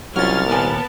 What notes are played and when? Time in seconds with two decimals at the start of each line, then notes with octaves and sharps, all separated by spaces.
0.16 C2 F#3 C#4 F4 F6 A6
0.50 D#2 A#2 B3 A#4 G#5 A5